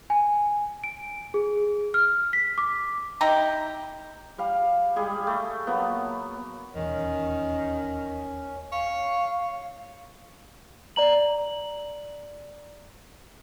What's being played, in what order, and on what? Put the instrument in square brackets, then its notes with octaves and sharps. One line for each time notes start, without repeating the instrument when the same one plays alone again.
[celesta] G#5
D7
G#4
F6
B6
D6
[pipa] D#4 E4 G4 A#5
[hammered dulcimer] G3 F5
G3 G#3 G#4
A3
F#3 A#3 B3
[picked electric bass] D#1 E2 [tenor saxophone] D#3 [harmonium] C#4
[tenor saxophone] C#5 [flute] F5
[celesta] D5 A#5 F#7